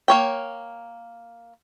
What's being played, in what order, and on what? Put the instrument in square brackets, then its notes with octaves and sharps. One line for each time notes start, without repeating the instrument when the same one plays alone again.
[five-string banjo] A#3 C#5 G5